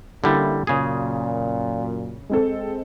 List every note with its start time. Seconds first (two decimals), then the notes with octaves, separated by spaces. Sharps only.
0.24 D3 G3 A#3 C#4 E4
0.67 F#2 A#2 C#3 G#4
2.29 G#3 C4 A4